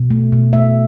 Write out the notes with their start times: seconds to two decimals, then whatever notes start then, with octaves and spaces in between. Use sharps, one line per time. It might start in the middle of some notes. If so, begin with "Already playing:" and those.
Already playing: B2
0.11 A3
0.32 B2
0.53 A3 E5